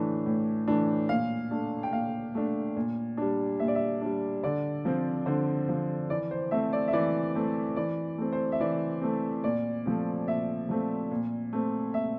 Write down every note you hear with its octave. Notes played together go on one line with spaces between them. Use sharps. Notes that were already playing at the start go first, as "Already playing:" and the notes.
Already playing: A2 E3 A3 D4
A2
E3 A3 D4
A#2 F5
A3 D4
G5
A#2 F5
A3 D4
A#2
G3 D4
A#2 E5
D5
E5
G3 D4
D3 D5
F3 C4
D3 C5
F3 C4
E3 D5
C5
A3 C4 E5
D5
E5
E3 D5
A3 C4
E3 D5
A3 C4
C5
E5
E3 D5
A3 C4
A#2 D5
F3 A3 C4
A#2 E5
F3 A3 C4
A#2
A3 C4
A#2 E5